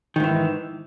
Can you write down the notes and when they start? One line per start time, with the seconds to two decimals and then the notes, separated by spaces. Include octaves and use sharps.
0.16 D#3
0.20 G#2
0.24 E3